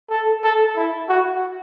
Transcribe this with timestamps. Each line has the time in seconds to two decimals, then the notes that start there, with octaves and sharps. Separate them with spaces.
0.10 A4
0.44 A4
0.76 E4
1.09 F#4